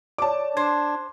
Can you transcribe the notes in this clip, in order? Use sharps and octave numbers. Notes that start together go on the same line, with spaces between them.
C#5 D5 A5 D6
D4 C5 G#6